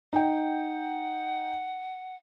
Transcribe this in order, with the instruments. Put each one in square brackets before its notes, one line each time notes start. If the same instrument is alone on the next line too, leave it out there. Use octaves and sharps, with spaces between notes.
[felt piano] D#4 G5 [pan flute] F#5